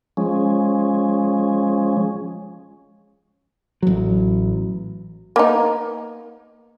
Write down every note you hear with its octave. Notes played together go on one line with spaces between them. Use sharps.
F3 G#3 C#4
A1 F#3
A#3 B3 D#4